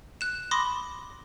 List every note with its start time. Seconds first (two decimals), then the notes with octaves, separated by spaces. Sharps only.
0.21 F#6 E7
0.51 B5 C6 D6 D#6 A#6